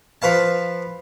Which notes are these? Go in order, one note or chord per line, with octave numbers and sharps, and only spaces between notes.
F3 B4 F5 A5